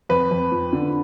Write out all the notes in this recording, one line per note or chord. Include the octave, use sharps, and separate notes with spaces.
F2 B4
F2
F3
D3